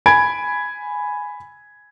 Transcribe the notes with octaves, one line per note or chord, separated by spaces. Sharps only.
G#5 B5 G#6 D7